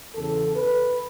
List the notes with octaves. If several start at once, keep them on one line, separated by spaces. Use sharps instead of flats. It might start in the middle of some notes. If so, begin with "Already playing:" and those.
E2 C#3 E3 A4
B4